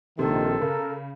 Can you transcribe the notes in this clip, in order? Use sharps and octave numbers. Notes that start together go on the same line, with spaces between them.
A#1 C3 D#3 A4
C#3 A#4